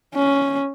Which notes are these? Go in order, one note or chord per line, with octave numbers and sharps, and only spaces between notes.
C#4